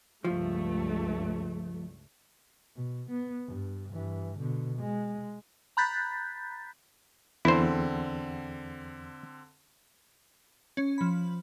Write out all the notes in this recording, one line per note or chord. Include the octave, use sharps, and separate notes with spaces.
C#2 G2 F3 A3
B2
B3
G2
G2 E3
B2 D3
G#3
A#5 B5 F#6 G6 A6 B6
E2 D3 C4 E4 C5
C#4
F3 B5